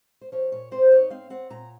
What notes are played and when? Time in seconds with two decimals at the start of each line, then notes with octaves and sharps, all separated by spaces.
0.21 C5
0.32 F3 C#5
0.52 A#2 C#5
0.71 C4 C5
0.91 D#4 C#5
1.10 C4 F5
1.30 C4 F#5
1.50 A#2 A#5